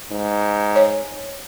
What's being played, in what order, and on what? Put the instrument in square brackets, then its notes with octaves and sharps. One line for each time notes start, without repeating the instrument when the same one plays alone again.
[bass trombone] G#2
[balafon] C#5